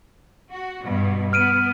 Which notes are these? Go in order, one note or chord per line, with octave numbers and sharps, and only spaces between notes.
F#4
G2 B2
B3 F6 D7 D#7